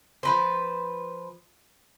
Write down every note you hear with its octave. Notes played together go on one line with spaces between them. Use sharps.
F3 B4 C5